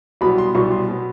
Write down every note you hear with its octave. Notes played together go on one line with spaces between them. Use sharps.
C2 B2 F#3 B3 B5
C6
C2 B2 F#3 B3 C#6
C6
B2 F#3 B3